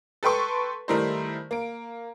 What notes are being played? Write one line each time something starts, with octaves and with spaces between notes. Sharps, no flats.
A4 B4 G5 C6 C#6
D#3 G3 A3 E4 A#4 C5
A#3 D7